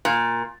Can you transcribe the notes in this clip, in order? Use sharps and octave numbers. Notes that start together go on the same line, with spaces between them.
A#2